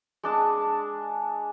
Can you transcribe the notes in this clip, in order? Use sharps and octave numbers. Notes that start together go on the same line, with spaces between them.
G#3 D4 A5